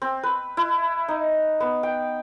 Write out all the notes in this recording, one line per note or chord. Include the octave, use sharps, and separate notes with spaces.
C4
B4
E4
D#4
B3
G5